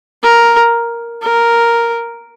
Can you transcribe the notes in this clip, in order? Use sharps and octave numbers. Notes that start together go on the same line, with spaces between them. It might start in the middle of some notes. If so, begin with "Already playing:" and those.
A#4
A#4